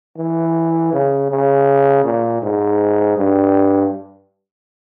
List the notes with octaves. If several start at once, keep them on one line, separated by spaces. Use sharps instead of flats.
E3
C#3
C#3
A#2
G#2
G2